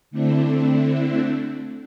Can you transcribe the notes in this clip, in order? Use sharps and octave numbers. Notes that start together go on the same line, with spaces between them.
D3 A3 C4 D4 E4